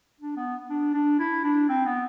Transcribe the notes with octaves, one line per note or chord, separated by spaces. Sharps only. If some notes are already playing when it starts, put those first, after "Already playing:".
D4
B3
D4
D4
E4
D4
C4
B3